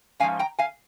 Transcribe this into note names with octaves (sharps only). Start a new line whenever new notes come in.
G#2 F3 G#3 C#4 F5 G#5
G5 A#5
F5 G#5